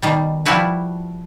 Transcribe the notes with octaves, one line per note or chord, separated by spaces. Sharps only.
B2 D#3 G3
F3 G3 E4 F#4 B4